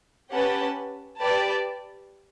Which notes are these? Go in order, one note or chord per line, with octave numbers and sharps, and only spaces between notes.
C#4 G4 B4 F#5 A5
G4 B4 D5 A5